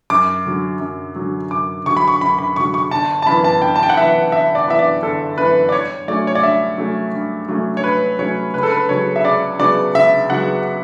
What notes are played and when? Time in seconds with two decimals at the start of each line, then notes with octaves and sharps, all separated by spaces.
0.10 F#2 D6
0.45 D3 F#3
0.81 F#2
1.16 D3 F#3
1.51 F#2 D6
1.86 D3 F#3 C#6
1.97 B5
2.08 C#6
2.21 F#2 B5
2.39 B5
2.56 D3 F#3 C#6
2.74 C#6
2.91 G1 A5
3.22 A5
3.26 F#2 E3 B3 B5
3.44 A5
3.62 G1 G5
3.76 A5
3.83 G5
3.90 F#5
3.97 F#2 E3 B3 E5
4.32 G1 E5
4.55 D5
4.67 F#2 E3 B3 E5
4.79 D5
5.03 G1 A4
5.37 F#2 E3 B3 B4
5.69 D5
5.72 G2 C#5
6.08 F#3 A3 C#4 D5
6.27 C#5
6.35 D5
6.43 G2 E5
6.78 F#3 A3 C#4
7.13 G2
7.49 F#3 A3 C#4
7.77 C#5
7.84 G2 B4
8.19 F#3 A3 C#4 C#5
8.54 C#2 B4
8.63 A4
8.72 B4
8.89 C#3 F#3 B3 C#5
9.16 E5
9.24 C#2 D5
9.59 C#3 F#3 B3 D5
9.94 C#2 E5
10.30 C#3 F#3 B3 F#5